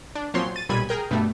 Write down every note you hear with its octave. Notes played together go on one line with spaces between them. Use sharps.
D4
A#2 F3 F#3 C4 C#5 C6
A6 D#7
B1 A#2 G3 B5 G#6 D#7
G#4 A#4 G5
G2 B2 G3 A3